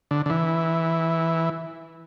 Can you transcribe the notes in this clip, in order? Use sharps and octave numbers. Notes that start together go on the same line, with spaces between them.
D3
D3
E3